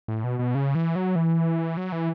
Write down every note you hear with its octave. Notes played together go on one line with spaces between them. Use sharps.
A2
B2
B2
C#3
E3
F#3
E3
F#3
E3